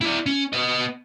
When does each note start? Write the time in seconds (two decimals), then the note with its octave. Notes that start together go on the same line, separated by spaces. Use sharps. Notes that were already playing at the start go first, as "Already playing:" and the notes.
0.01 E4 D5
0.26 C#4
0.53 B3 D#5